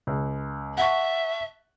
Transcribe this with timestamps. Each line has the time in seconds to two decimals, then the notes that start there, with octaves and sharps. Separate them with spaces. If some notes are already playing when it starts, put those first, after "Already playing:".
0.07 C#2
0.78 E5 F#5 A5 C#6